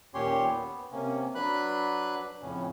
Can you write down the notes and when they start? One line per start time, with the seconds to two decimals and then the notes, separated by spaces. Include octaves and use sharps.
0.14 D#2 A#2 C#4 G4 C#5 C6
0.46 B3
0.92 C3 A#3 C#4
1.35 F#3 D4 B4 B5 F#6
2.42 F2 A2 C#3 C#4